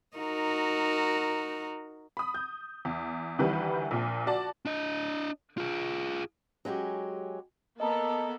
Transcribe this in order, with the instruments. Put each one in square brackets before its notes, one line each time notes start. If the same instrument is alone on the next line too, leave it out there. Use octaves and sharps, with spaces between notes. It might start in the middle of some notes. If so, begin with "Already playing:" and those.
[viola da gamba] D#4 F#4 A#4
[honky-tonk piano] B5 D#6
G6
E2
D2 D#3 E3 G3 B4
A#1 A#2
F#4 D5 A5
[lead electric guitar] D4 D#5
F4 G#4
[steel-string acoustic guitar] F#3 G#3 C#4 G4
[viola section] A#3 B3 A4 [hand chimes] D#5 A5 A#5